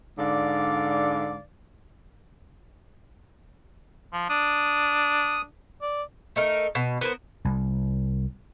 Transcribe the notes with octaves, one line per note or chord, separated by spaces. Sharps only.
G#2 D3 D5 F5
F3
D4 D#6
D5
A3 D#4 A#4
B2
B3 A#4 C5
C2